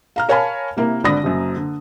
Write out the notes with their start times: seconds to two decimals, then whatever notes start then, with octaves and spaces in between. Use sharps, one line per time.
0.16 F5 A#5 F6
0.29 A#4 C#5 F5 G#5 A5 B5
0.77 C3 A#3 E4 A#4
1.04 G#1 D3 D5 B5 D#6 A#6
1.24 F#1 F#2
1.56 D3